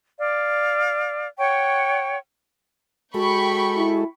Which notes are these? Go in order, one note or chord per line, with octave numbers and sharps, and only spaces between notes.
D5 F5
C#5 F#5 G5 C#6
G#3 F#4 A4 G5 B5 C#6
E4